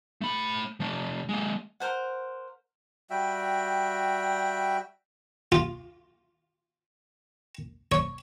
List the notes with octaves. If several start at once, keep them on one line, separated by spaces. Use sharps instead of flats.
A3 B5
F3 A3
G#3 A#3
A#4 C5 F#5
G3 F#4 E5 G5
F4
C#5